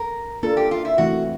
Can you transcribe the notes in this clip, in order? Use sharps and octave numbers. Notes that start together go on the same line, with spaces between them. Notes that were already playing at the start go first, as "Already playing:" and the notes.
Already playing: A#4
A#3 D4 F4 A4 A#4
G4
F4
E4
E3 A3 C4 E4 F#4